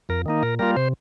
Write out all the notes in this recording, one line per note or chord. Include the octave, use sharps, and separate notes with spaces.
F2 A#4
D#3 A#3 D#4
A#2 A#4
G3 A#3 F4 A#4
C3 C5